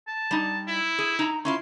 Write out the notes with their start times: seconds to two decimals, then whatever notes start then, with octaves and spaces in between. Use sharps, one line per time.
0.07 A5
0.31 G3 D#4
0.67 E4
0.99 G#4
1.19 D#4 A#5
1.45 C#4 E4 F4 C6